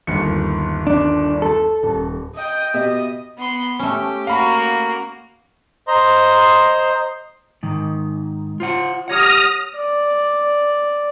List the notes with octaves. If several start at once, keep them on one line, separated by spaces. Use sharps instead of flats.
G1 D#2 C#7
D4
A4
D#1
D#5 G5
B2 G4 D#5 E5
B3 C6
A3 C#4 G4
A#3 F#4 F5 B5
C5 D#5 A#5 C6
G#2 D#3
F4 C5 F#5
G4 C#5 F#5 D#6 F6 A#6
D5